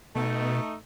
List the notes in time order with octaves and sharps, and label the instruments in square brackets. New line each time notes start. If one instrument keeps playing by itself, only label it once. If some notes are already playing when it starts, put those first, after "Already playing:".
[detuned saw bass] B2 [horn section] A3 D#4